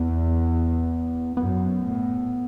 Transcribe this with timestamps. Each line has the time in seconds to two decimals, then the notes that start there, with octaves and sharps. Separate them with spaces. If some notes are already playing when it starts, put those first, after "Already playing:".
Already playing: E2 B3
1.37 F#2 B3
1.83 A2